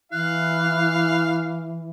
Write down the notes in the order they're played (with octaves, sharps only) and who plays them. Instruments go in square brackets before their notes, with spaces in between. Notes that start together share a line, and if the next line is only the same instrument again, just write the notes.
[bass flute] E3 [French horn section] E4 [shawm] F5 [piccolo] F#6